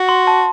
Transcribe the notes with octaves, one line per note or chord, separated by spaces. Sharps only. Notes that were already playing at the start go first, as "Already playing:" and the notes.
Already playing: F#4
C6
A5